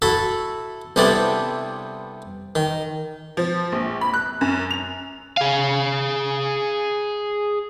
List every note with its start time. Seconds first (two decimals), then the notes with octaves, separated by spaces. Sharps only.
0.02 E4 F#4 A4 E5
0.96 C2 C3 B3 D4 E4 A4
2.55 D#3
3.37 F3
3.72 A#1
4.01 B5
4.14 F#6
4.41 F#2
4.71 F7
5.37 G#4 F5